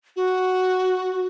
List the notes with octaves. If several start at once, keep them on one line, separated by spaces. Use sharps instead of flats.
F#4